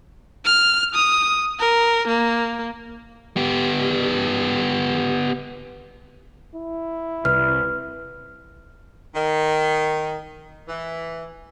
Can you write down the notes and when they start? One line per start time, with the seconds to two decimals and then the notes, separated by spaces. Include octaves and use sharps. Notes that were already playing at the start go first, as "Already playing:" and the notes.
0.45 F6
0.95 D#6
1.59 A#4
2.07 A#3
3.37 B3 G4
6.55 E4
7.25 C2 B4 F6
9.14 D#3
10.68 E3